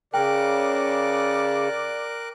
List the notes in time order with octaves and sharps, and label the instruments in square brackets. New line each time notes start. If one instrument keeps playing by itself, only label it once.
[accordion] C#3 [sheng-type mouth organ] A#4 D6 F#6 [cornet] D5 [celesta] G5